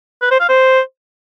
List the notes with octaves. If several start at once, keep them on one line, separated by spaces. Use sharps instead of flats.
B4
C5
F5
C5